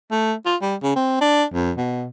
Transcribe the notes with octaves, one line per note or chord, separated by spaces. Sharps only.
A3
F4
G3
C#3
C4
D4
F2
B2